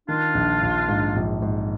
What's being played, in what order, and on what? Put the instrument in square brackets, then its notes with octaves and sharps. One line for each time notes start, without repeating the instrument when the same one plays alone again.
[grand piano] D#3 [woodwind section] D4 F4
[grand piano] A#1
A#1
G#2
A#1
G#2